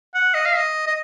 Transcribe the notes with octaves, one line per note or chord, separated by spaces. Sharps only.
F#5
D#5
F5
D#5
D#5